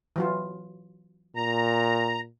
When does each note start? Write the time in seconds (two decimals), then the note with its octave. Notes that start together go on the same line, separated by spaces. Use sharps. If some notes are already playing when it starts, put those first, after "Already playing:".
0.16 E3 F#3 F4
1.36 A#2 A#5